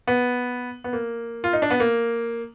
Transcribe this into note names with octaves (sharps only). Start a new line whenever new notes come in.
B3
B3
A#3
F4
D#4
D4
B3
A#3